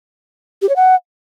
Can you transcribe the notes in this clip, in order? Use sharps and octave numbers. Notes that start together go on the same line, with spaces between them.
G4
C#5
F#5